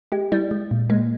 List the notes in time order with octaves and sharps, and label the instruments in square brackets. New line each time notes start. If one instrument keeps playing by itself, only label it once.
[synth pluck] G#3 [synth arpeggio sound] G4
[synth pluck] G3 [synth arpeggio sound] E4
[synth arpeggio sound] G#3
A#2
[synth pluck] G#3 [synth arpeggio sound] A#3